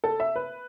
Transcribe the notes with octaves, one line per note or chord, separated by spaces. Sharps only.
A4
E5
B4